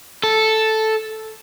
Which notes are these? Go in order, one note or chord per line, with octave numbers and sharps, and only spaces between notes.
A4